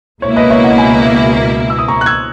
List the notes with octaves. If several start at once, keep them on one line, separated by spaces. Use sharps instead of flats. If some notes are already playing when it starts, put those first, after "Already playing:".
C#2 B2 A#3 E4 C#5
B4 D#5
C#5 E5
D#5 F#5
G#5 B5
E6
D#6
A#5 C#6
F#6
E6 G#6